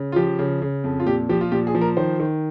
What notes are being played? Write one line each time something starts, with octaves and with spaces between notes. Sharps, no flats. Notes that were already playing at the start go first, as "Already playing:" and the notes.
Already playing: C#3
F4
F3 G4
C#3
C#3
F2
F4
A#2 G4
F3 G4
F4
A#2 G4
G#4
F3
A#4
D#3 C5
D#3